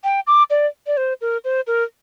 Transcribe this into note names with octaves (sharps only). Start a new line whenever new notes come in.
G5
D6
D5
D5
C5
A#4
C5
A#4